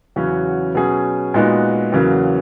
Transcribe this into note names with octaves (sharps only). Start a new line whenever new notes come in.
E2 C#3 F#3 C#4 F#4
B2 F#3 C#4 G#4
A#2 G#3 B3 D#4 F#4
E2 C#3 F#3 A#3